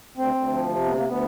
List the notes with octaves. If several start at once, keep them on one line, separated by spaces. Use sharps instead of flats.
D2 C4
D2
F3
C3
D2 B3
A#3
D2
B3